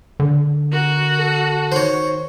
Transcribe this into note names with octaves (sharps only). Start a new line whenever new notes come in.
D3
F#4 A#4
A4
D#3 C5 C#5